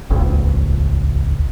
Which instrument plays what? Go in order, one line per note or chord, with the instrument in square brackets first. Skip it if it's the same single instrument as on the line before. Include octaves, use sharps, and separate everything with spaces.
[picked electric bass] D#1 G#1 C#2